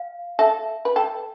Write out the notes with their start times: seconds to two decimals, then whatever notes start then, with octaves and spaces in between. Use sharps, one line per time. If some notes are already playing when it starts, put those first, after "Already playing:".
Already playing: F5
0.39 A4 E5
0.85 B4
0.96 A4 G5